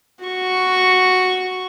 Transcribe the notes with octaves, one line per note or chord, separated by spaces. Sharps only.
F#4 C#6